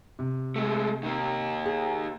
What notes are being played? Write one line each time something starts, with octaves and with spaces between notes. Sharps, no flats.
C3
G#3 A3
D#3 A#3
G#4